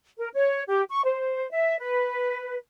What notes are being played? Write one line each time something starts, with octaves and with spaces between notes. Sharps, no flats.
A#4
C#5
G4
C#6
C5
E5
B4